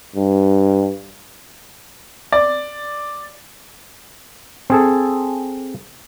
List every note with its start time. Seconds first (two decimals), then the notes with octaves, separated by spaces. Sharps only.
0.16 G2
2.32 D5
4.70 C4 G#4 A4